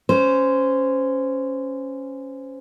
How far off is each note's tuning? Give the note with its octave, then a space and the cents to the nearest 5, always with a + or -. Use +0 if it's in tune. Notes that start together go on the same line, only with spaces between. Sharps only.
C#4 -5 C5 -20